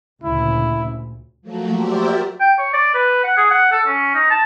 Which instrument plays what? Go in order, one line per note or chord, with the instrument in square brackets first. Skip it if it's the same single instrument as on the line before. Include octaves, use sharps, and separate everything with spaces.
[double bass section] D2 A#2 C#3 [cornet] E4
[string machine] F3 F#3 A3 A#3 F#4
F#4 G4 A#4 C5 D5 E5
[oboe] G5
C#5
D5
B4
F#5
G#4
F#5
A4
C#4
D#4
A5